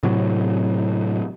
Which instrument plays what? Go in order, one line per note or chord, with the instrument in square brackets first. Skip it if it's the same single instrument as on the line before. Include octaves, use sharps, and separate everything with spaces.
[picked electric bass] A2 C3 F#3